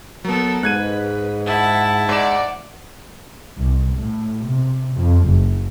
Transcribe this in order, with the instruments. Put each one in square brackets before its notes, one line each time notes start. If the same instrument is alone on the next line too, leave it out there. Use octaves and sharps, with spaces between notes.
[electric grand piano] F#3 B3 [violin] A4 A#4
[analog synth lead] G#2 [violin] B4 [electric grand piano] F#6 G#6 D#7
[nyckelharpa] E4 A5 [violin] F#5
[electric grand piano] G#2 E7 [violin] D5 F#5
[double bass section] C2
A2
C3
F2
F#1